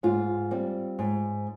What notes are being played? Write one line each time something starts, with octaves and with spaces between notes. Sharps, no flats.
G#2 F4
G3 C4
G#2